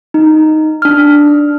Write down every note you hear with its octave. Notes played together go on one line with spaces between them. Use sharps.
D#4
D4 F6